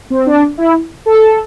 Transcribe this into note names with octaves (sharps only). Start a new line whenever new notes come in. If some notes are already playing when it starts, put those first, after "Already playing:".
C4
D4
E4
A4